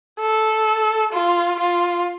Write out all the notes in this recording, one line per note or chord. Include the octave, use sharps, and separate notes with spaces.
A4
F4
F4